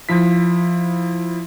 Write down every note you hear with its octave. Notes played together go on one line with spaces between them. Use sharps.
F3 E4 B6